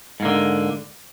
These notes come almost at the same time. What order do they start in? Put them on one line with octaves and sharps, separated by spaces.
G#2 A#3 D3